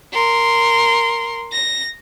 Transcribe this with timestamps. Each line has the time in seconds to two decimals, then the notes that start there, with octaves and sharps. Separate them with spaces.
0.13 A#4 C6
1.52 A#6